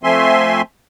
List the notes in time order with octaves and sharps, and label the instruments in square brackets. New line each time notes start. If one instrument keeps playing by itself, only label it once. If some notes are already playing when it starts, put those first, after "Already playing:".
[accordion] F3 A3 C4 E5 G#5 C6